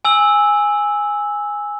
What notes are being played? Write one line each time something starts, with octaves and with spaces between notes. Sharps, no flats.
G#5 E6 F#7